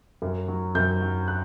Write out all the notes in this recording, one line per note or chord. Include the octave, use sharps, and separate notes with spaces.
F#2
F#3
F#2 G6
F#3
F#6